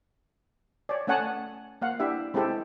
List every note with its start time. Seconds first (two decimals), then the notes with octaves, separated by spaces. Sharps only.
0.89 C#5 D5
1.07 A3 C#4 C#5 F#5 G#5 A5
1.82 A#3 F5 F#5
2.00 D4 E4 G4 E5
2.34 G#3 C4 E4 G4 A4